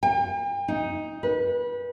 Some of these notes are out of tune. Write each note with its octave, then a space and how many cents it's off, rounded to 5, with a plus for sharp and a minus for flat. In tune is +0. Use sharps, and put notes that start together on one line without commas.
G5 +45
D#4 +5
B4 -25